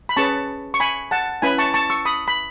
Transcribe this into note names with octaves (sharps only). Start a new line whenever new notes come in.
B5
C#4 G#4 B4 A5 C#6
C#6
G#5 B5
F#5 A5
C#4 E4 B4 G#5 B5
A5 C#6
A5 C#6
C#6 E6
B5 D#6
B5